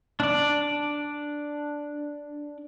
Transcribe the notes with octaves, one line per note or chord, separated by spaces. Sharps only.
D4 D5